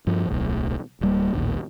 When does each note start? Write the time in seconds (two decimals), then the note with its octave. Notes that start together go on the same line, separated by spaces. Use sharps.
0.07 G2 F3
0.28 D1 B1 A2
1.01 D1 G3 A#3
1.34 A1 D#2 A#2